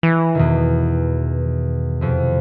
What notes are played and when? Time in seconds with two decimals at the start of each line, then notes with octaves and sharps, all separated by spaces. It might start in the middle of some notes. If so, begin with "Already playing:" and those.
0.03 E3 A#6
0.35 E2 B2 D#3
2.01 F2 C3